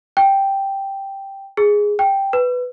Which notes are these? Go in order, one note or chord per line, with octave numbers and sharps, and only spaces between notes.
G5
G#4
G5
B4